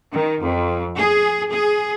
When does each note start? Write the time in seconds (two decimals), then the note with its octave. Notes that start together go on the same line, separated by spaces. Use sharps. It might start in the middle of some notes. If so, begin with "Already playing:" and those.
0.12 D#3
0.43 F2
0.97 G#4
1.51 G#4